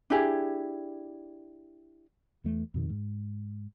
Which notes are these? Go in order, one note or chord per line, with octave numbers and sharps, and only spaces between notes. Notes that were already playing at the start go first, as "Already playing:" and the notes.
D4 E4 G4 G#4
E2 E3 A3
F2 B2 D#3
G#2